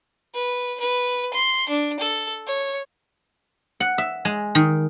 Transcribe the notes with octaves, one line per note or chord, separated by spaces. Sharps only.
B4
B4
C6
D4
A4
C#5
F#5
E5
G#3
D#3